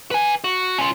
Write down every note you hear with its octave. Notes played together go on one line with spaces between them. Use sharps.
B4 G#5
F#4
C#4 F4